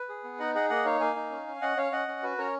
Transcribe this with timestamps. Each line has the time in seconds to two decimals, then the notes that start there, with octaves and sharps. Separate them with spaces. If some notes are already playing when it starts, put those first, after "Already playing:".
Already playing: B4
0.09 G#4
0.24 B3
0.39 D#4 D#5 F#5
0.55 G#4 D#5 F#5
0.70 A#3 D#5 F#5
0.85 D#4 C#5 F5
1.01 A#3 F5 G#5
1.16 D#4
1.31 C#4
1.47 C#4
1.62 C#4 D#5 F#5
1.77 C#4 C#5 F5
1.92 C#4 D#5 F#5
2.08 C#4
2.23 F#4 B4
2.38 C#4 A#4 C#5